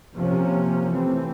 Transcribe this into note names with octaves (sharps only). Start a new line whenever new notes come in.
C3 F3 A#3 C#4
E3 A3 C4